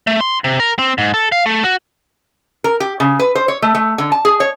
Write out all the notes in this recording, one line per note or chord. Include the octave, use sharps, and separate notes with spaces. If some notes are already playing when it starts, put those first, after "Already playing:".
A3
C6
C3
A#4
C4
G#2
A4
F5
A3
F#4
A#4
G4
C#3
B4
C5
C#5
A3
A3
D3
A5
G#4
C#5